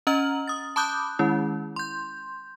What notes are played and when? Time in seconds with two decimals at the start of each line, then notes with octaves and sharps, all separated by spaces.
0.07 C#4 D#5 A#5 F6 F#7
0.47 D#6 A6
0.76 A5 B5 D6 D#6 F#6 G6
1.19 D#3 G#3 C#4 E4
1.76 C6 G6